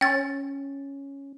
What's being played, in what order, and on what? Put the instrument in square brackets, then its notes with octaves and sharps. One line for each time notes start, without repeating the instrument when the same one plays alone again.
[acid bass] C#4 [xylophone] G5 A6